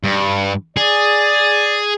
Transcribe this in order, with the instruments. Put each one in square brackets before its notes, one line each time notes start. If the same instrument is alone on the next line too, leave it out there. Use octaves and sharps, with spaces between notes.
[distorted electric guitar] G2
[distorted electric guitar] G#4 [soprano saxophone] D5